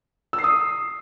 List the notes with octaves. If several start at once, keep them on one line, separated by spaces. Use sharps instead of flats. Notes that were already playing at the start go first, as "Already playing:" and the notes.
E6
C7
D#6